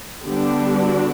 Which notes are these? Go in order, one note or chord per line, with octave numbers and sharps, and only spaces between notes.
D3 G3 B3 D4 G4
F#4